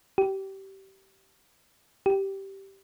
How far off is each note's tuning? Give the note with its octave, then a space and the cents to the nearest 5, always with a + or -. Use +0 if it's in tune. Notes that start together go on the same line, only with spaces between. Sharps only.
G4 -25
G4 -10